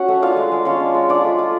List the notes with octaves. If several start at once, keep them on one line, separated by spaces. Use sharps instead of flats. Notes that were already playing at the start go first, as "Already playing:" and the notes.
Already playing: C#4 F#4 C#5 F#5
A3
D4 F4 F5
G#3
G#3
C#4 F4 C#5
D4
G#3
D4 F4 D5
A3
F4